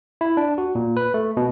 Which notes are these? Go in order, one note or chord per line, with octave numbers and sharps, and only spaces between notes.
E4
D4
F#4
A#2
B4
A3
B2